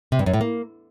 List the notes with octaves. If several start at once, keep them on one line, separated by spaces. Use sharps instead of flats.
C3
G2
F#2
A2
A#3